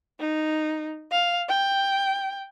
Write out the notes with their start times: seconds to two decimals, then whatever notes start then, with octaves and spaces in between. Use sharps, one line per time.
0.20 D#4
1.11 F5
1.49 G5